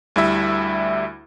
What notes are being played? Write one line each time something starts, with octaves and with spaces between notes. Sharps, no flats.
D2 G3 E4 E5